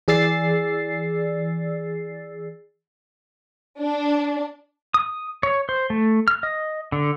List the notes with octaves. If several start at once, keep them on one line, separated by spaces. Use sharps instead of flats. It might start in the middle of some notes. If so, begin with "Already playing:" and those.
E3 G#4 D5 E6 A6 C7
D4
D#6
C#5
C5
A3
F6
D#5
D3